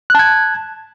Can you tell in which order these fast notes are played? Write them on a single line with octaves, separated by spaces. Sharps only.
F#6 A5 G#6